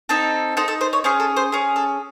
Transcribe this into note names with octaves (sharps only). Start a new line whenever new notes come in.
C4 D#4 A4
D#4 A4 C5
A4
C5
C#5
C#4 G#4 C5
A4
C5
C#4 G#4
A4